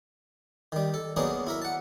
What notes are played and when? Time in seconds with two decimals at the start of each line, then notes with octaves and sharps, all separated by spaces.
0.72 D#3 G3
0.94 A4
1.16 F#3 A#3 B3 D4 D#4 G#4
1.47 E4 A#4 E5
1.62 F#5 A5